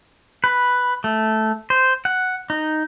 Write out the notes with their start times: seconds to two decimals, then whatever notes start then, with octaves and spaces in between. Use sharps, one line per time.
0.44 B4
1.04 A3
1.70 C5
2.05 F#5
2.50 D#4